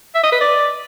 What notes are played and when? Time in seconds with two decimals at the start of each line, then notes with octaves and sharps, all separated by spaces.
0.15 E5
0.24 D#5
0.32 B4
0.41 D5